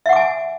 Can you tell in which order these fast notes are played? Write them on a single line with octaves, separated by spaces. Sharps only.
E5 F#5 D6 G#5